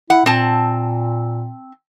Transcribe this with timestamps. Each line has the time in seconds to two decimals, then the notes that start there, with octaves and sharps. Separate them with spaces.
0.10 E4 F#5
0.26 A#2 C4 A5